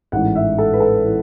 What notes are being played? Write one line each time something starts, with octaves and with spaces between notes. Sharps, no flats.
A1 G#2 E3 F#5
E5
A4
B4
A4
E3